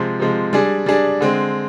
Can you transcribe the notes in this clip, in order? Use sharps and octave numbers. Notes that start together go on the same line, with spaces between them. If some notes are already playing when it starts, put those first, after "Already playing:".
Already playing: C3 F3 G#3
C3 F3 G#3
G3 D4 G#4
G3 D4 G#4
D3 G#3 C4